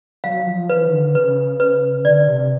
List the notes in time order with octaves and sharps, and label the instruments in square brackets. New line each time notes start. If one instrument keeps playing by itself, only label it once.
[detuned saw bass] F#3 [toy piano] F5
[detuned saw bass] F3
[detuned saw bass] E3 [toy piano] B4
[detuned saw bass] D#3
D3
[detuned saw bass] C#3 [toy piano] B4
[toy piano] B4
[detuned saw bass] D3 [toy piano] D5
[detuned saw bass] C3